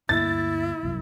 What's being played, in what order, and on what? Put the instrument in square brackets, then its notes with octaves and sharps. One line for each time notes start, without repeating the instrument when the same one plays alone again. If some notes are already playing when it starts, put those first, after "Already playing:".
[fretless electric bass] D2 G2 A#3 [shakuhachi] E4 [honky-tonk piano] A6
[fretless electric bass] G1 C2 F#2